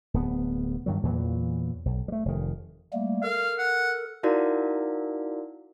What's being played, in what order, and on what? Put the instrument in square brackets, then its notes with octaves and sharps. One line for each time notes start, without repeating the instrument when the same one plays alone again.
[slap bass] D1 B3
G2 D#3 F#3
E2 A#2 E3 F#3
B1
G3 A3
F1 D#3
[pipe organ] G3 A3 A#3
[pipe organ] A4 A#4 [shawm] F5
[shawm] F#5
[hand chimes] D#4 E4 F#4 A#4 D5 F5